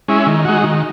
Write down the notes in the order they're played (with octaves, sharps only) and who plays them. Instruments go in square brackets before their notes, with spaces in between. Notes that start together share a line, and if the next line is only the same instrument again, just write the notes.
[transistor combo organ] G#3 C#4 E4
D#3
G#3 D#4 F#4
D#3